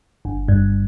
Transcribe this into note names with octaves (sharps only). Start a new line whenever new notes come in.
G1
G2